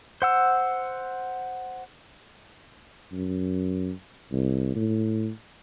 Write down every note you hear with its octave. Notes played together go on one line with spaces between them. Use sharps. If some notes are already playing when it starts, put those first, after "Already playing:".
C5 F#5 E6
F#2
C2
A2